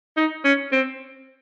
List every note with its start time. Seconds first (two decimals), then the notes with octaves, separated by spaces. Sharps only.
0.17 D#4
0.44 C#4
0.72 C4